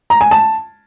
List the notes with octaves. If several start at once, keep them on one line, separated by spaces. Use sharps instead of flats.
A#5
G#5
A5